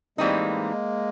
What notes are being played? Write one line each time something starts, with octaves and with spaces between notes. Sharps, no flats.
A2 E3 G3 G#3 A#3 C4 D#4